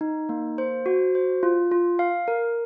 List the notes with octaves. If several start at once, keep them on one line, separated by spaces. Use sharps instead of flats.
D#4
A#3
C5
F#4
C5
F4
F4
F5
A#4